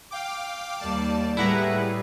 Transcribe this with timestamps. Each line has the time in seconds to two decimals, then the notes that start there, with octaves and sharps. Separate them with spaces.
0.11 F5 G5 D6
0.79 D#2 G3 A#3 D5 A5
1.37 A2 G3 E4 G#4 B4 F#5 A#5